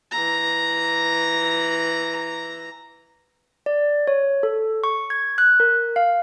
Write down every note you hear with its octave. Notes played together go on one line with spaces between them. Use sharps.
E3 A#5
D5
C#5
A4
C#6
G#6
F#6
A#4
F5